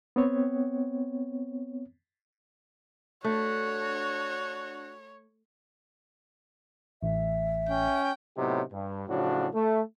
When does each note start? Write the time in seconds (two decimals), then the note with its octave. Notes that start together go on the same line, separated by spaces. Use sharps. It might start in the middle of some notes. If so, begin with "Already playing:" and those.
0.16 B3 C4 C#5
3.24 A3 D4 F#4 C#5
7.03 A1 E5
7.69 C#4 G5
8.37 A2 C3 F#3 B3 D#4 G4
8.72 G2
9.08 A2 C#3 F3 F#3 D4 F#4
9.53 A3